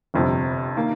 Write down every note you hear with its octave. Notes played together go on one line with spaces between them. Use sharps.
G1 F2 C3
D#3 A#3